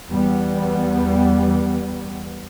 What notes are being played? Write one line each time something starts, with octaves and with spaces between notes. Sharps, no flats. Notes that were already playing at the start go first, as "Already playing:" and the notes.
E2 G3 B3